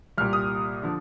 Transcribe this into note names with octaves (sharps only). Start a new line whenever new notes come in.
C2 A#2 G3 F6
D#6
D3 F3